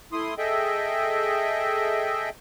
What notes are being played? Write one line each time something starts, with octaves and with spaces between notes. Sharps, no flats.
A3 E4 C6 D#6
G#4 A4 D#5 E5 G5